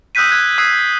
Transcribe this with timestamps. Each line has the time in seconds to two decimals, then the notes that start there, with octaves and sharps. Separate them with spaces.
0.15 D#6 E6 F#6 G6 B6 D#7
0.31 F#6 G#6
0.58 D#6 E6 F#6 G#6 C7 D#7